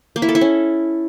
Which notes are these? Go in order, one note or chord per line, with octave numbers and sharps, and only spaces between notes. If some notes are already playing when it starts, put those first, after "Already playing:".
A#3
E4
A4
E4
C#4